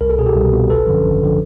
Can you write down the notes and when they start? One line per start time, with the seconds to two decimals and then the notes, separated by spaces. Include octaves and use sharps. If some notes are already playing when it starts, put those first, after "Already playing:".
0.01 C2 A#4
0.10 A4
0.18 B2 G#4
0.26 G4 A4
0.36 C2
0.52 B2
0.70 G#1 A4 B4
0.87 F#2 D3 F3
1.03 G#1
1.23 D3 F3